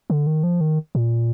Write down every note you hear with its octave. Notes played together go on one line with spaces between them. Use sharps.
D3
D#3
F3
D#3
A#2